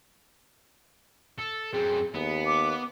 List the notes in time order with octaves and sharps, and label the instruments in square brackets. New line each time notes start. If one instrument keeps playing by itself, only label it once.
[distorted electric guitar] A4
[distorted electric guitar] F#2 C4 [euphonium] G#4
[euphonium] D#2 [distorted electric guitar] B3
[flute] D6